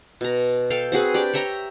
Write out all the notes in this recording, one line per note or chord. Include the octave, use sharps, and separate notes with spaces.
B2 A#5
A4 F5 G5
C4 F#4 G#4 B4
D4 G4 D5
C#5 E5 G5 A#5